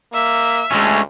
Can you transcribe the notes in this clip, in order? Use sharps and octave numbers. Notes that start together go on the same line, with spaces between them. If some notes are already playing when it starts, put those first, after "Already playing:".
A#3 E5
D2 G#3 A3 C#4